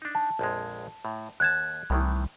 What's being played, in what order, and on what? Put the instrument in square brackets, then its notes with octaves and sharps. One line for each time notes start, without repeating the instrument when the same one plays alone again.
[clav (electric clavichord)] D4 D#4
[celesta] A5
[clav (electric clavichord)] A#1 F2 G#3
A2
[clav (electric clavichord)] D#2 A5 [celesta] F#6 G#6
[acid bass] C2 [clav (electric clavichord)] A2 D#3 E3